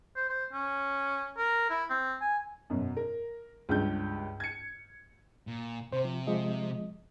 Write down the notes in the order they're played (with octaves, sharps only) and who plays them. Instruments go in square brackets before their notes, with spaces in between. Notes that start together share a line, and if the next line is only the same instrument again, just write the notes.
[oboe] C5
C5
C#4
A#4
E4
C4
G#5
[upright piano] F#2 B2
A#4
C#2 G2 G6
G#6 C#7
[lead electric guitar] A#2
[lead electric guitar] C3 [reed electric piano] C5 C6
[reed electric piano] F3
F3 G#3 D#5